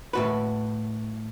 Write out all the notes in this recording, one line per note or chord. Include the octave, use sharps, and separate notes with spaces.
A2 F#4 B4